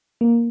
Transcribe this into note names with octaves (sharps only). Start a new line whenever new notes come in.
A#3